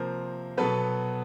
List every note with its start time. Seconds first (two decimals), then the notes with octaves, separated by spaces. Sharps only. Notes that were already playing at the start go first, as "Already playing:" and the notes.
Already playing: C3 F3 A#3 A#4 C5
0.57 B2 F#3 B3 A4 B4